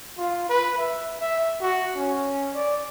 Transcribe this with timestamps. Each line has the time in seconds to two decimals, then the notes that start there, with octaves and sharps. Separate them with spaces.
0.18 F4
0.49 B4
0.78 E5
1.20 E5
1.61 F#4
1.97 C#4
2.55 D5